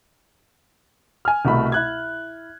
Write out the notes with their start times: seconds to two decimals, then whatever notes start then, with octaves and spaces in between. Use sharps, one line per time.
1.25 G#5 F6
1.45 C2 B2 A3 B5
1.72 E4 F#6 G#6